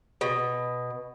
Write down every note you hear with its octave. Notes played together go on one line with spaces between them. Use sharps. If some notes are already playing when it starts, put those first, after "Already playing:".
B2